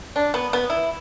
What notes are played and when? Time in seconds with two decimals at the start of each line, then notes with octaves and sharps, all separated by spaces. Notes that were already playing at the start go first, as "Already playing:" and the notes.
0.16 D4
0.34 B3
0.53 B3
0.70 E4